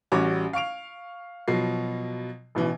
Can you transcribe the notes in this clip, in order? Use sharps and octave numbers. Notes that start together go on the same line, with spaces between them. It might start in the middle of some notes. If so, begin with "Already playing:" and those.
A1 G3 C#4 F#4 C#5 D6
F5 C#6 D7 F7
B2 F3 F#3 C7
A1 B2 E3